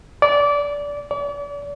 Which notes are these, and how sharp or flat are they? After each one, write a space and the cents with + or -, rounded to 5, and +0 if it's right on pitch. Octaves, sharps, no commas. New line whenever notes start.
D5 -20
D5 -40